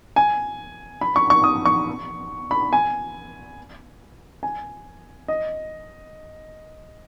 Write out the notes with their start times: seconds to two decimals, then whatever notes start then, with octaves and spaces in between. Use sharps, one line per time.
0.16 G#5
1.01 B5
1.16 C#6
1.30 C#6
1.44 D#6
1.65 C#6
2.51 B5
2.73 G#5
4.43 G#5
5.28 D#5